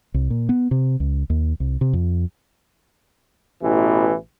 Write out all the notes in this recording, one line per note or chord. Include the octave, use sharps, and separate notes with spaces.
C2
A#2
B3
C3
C#2
D#2
C2
C3
F2
A1 B2 E3